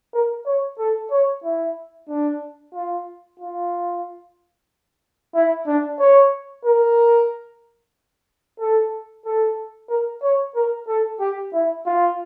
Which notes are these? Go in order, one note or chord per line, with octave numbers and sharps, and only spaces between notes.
A#4
C#5
A4
C#5
E4
D4
F4
F4
E4
D4
C#5
A#4
A4
A4
A#4
C#5
A#4
A4
G4
E4
F4